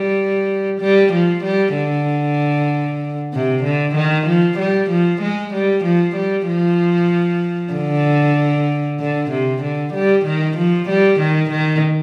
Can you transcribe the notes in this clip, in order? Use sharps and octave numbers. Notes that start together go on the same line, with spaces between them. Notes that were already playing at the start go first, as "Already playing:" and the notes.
Already playing: G3
G3
F3
G3
D3
C3
D3
D#3
F3
G3
F3
G#3
G3
F3
G3
F3
D3
D3
C3
D3
G3
D#3
F3
G3
D#3
D#3